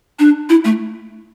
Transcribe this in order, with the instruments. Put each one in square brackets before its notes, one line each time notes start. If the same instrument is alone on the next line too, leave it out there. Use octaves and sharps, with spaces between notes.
[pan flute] D4
E4
A3